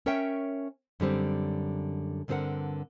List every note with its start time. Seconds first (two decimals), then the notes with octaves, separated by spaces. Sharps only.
0.06 C#4 A#4 C#5 E5 G5
1.00 F#2 D3 G3 C4
2.28 G2 D3 C4 G#4 A#4 F#5